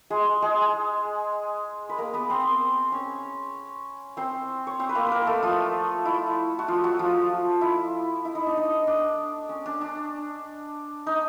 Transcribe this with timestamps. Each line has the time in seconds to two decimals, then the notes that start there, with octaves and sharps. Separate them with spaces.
0.10 G#3 G#4
0.42 G#3 G#4
1.89 B4
1.98 A#3 A#4
2.14 B3 B4
2.30 C4 C5
2.92 C#4 C#5
4.17 C4 C5
4.67 C#5
4.79 C4 C5
4.89 B4
4.95 A#3 A#4
5.07 A#3 A#4 B4
5.27 A3 A4
5.42 F3 F4
6.05 E4
6.59 F#4
6.68 F3 F4
6.84 F#3 F#4
6.99 F3 F4
7.61 E4
8.25 E4
8.35 D#4
8.46 D4
8.57 D#4
8.87 D4
9.49 C#4
9.66 D4
9.81 D4
11.06 D#4